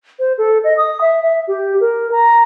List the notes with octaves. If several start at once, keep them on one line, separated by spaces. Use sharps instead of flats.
C5
A4
D#5
D#6
E5
E5
G4
A#4
A#5